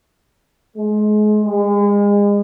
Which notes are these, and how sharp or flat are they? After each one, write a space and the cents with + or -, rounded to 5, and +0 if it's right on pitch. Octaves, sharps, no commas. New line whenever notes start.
G#3 +30
G#3 -35